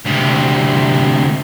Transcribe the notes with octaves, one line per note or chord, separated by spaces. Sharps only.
D2 C3